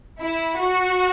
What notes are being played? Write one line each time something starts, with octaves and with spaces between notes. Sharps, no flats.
E4
F#4